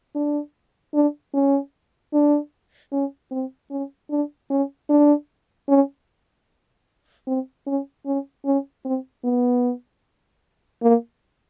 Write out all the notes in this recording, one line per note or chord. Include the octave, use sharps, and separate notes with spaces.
D4
D4
C#4
D4
C#4
C4
C#4
D4
C#4
D4
C#4
C4
C#4
C#4
C#4
C4
B3
A#3